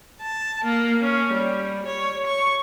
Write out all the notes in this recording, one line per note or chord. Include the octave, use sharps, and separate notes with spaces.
A5
A#3
C#4
G3
C#5
C#6